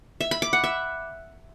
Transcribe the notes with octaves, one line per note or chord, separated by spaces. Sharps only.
E5
B5
D6
F#5
E5